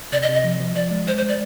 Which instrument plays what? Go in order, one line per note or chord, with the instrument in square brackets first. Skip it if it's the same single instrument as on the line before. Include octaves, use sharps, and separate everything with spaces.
[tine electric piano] C3 [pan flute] D5
[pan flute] D#5
[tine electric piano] C3
[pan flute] D#5
[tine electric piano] F3
F3
[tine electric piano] F3 [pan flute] D5
[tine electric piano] G#3
[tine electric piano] G#3 [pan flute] C5
[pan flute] C5
[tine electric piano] G#3
[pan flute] D5